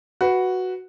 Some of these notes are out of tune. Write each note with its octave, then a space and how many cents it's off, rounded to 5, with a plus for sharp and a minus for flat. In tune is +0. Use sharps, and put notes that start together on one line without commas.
F#4 +0 B4 +0